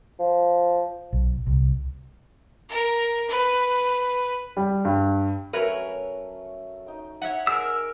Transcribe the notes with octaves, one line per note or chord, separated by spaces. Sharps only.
F3
B1
C2
A#4
B4
G3
G2
F#3 A3 C#4 A#4 B4 C#5
D#4 G5
C#5 E5 F#5
G#3 A#4 E6